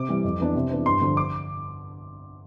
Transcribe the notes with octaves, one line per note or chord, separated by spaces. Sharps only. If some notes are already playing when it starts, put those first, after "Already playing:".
Already playing: C3 D6
E3 G3
F2
E3 B3 D4
C3
E3 B3 D4
G2 C6
D3 F3
D6